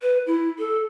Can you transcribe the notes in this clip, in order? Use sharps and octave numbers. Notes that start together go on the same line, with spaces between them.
B4
E4
A4